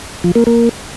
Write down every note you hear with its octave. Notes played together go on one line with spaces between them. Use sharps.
F3
A#3
A#3